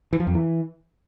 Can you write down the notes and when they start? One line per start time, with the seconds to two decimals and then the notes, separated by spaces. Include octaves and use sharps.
0.13 E3
0.20 F3
0.27 F2
0.34 E3